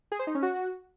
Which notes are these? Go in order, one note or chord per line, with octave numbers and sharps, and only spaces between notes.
G#4
C5
D#4
C#4
F#4